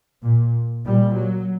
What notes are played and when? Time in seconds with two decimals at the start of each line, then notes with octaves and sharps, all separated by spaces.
0.23 A#2
0.85 A#2 G3
1.15 F#3